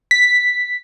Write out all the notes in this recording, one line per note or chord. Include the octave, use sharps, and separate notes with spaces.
B6